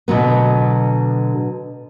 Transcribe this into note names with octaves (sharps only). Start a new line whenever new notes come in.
B2 D3 F#3 B3